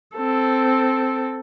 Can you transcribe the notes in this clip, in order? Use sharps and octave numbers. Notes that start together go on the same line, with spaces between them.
C4 A4